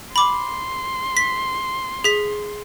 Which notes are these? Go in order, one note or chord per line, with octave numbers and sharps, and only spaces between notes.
B5 C6 D6
B6
G#4 B6